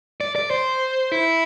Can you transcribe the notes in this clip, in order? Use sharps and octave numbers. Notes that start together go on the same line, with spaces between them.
D5
D5
C5
E4